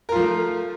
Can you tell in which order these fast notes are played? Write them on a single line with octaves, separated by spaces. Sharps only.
A#4 F4 F3 A3